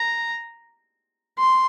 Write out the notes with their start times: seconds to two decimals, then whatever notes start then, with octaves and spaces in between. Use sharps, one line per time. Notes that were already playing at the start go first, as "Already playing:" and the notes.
Already playing: A#5
1.38 C6